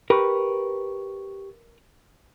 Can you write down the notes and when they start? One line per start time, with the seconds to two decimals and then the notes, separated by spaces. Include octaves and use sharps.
0.10 G4 A#4 B4 C#6